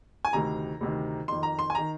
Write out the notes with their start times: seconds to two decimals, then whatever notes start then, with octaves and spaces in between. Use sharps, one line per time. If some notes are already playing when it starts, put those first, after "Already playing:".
0.25 G#5
0.33 D2 C3 D#3 A#5
0.81 D2 C3 D#3
1.28 F2 D#3 C6
1.43 A#5
1.59 C6
1.70 G#5
1.75 D#3 A#5